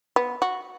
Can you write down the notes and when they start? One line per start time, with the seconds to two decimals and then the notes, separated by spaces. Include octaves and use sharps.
0.16 B3
0.42 F#4